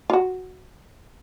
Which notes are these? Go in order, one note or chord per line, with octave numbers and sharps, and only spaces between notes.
F4
F#4